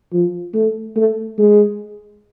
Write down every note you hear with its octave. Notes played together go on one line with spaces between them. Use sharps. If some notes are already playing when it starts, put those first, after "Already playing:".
F3
A3
A3
G#3